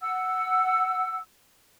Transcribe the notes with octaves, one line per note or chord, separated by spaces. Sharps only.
F#5 E6